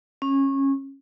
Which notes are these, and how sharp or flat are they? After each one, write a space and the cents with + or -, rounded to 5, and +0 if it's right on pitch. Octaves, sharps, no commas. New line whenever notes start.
C#4 -20